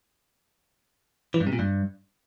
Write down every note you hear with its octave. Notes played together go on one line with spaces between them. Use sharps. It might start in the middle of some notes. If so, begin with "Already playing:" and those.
E3
G2
C3
A#2
G2